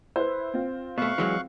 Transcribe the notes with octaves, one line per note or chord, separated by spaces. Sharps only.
E4 B4 C5
C4 F4
B2 A3 F5 C#6 F#6
E3 F#3 G#3